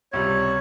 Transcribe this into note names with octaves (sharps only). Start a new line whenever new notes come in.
C#2 C3 G3 C#5